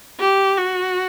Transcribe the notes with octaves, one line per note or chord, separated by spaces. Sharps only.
G4
F#4